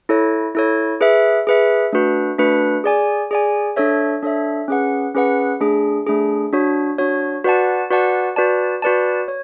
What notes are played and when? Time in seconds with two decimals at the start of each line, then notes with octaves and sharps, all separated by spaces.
0.09 E4 A4 C#5
0.55 E4 A4 C#5
1.01 G#4 B4 E5
1.47 G#4 B4 E5
1.93 A3 D4 F#4 B4
2.39 A3 D4 F#4 B4
2.84 G#4 D5 G#5
3.31 G#4 D5 G#5
3.76 D4 A4 C#5 E5
4.22 D4 A4 C#5 E5
4.68 C#4 G#4 B4 F#5
5.15 C#4 G#4 B4 F#5
5.60 A3 D4 G#4
6.07 A3 D4 G#4
6.53 D4 F#4 C#5
6.98 D4 F#4 C#5
7.44 F#4 B4 D5 F#5 A5
7.91 F#4 B4 D5 F#5 A5
8.36 F#4 B4 D5 A5
8.82 F#4 B4 D5 A5
9.28 C#5